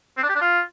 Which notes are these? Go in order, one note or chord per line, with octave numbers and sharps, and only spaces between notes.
C4
D4
G4
D4
F4